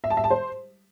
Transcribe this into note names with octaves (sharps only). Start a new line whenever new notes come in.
E5
A5
E5
A5
C5